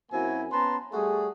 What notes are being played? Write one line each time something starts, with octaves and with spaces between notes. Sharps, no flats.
F#2 A#3 C4 E4 F#4 G#5
B3 C#4 B4 A5 A#5 C6
G3 A3 F#4 G#4